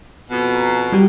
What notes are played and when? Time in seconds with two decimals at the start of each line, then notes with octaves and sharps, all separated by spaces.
0.30 F2 B2
0.55 A#5
0.92 G3 F#4 G4